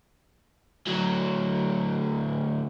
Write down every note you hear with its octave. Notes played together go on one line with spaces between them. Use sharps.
D2 F#3